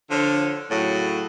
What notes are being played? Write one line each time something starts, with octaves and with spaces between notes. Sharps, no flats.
D3 F3 F4 C#5
A2 C#3 F#3